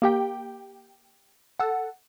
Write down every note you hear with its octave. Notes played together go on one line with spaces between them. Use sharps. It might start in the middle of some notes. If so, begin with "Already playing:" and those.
A#3 G4 G5
A4 F#5